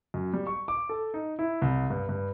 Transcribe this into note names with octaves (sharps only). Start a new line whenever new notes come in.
F#2
G3
C#6
D6
A4
D#4
E4
C2
G2
G2